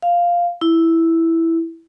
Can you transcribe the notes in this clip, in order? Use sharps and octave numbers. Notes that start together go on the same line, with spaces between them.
F5
E4